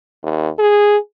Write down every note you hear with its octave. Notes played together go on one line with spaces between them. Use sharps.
D#2
G#4